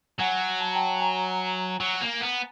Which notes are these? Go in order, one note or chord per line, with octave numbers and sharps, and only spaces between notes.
F#3 F#5 G#5
A5
A#5
G5 A5
G#5 A#5
F#3
A#3
B3